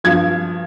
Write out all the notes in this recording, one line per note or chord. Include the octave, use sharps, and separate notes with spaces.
G2 F3 G#6